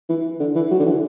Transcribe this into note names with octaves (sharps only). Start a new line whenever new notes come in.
E3
D3
E3
F#3
D3
E3